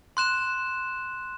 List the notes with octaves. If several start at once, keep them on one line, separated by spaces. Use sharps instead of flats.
C6 F#6 E7